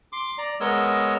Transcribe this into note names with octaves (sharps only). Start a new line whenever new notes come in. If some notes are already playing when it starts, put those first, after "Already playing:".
C6 D6
D5 A#5
G#3 B3 A#4 C#5 D#5 E6